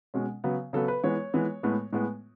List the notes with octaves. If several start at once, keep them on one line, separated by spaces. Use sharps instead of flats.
B2 G#3 C#4
C#3 F#3 B3
C#3 F#3 B3 A4
B4
E3 G#3 B3 C#5
E3 G#3 B3
A2 G#3 B3
A2 G#3 B3